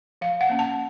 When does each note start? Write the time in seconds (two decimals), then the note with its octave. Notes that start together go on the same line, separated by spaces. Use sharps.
0.21 F3 F5
0.41 F#5
0.49 A#3 C#4
0.59 A5